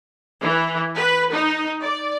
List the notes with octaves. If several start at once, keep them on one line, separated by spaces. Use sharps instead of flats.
E3
B4
D#4
D5